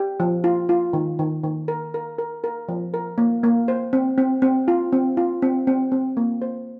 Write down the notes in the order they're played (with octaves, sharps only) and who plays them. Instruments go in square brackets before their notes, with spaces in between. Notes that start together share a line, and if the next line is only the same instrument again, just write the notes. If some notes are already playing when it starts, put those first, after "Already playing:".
Already playing: [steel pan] G4
F3
F4
F4
D#3
D#3
D#3
A#4
A#4
A#4
A#4
F3
A#4
A#3
A#3
C5
C4
C4
C4
F4
C4
F4
C4
C4
C4
A#3
C5